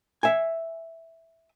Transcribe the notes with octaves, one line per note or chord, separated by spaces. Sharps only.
E5 G#5